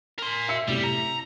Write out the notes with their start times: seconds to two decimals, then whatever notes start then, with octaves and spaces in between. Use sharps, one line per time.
0.19 A#4 C6
0.49 E5 E6 C#7
0.67 A2 C3 G3
0.84 A#5